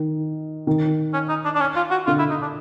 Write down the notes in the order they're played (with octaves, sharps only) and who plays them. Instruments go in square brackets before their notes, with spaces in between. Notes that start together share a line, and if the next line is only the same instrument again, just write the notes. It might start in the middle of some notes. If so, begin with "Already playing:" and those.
Already playing: [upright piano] D#3
D#3
[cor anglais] C#4
D#4
D4
D4
C#4
F4
F#4
[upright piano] D3 [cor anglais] F4
[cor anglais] E4
D#4
D4